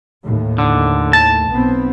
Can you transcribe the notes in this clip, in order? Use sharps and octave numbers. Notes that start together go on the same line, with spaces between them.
D#2 A2
D3
A5
B1 B3 C4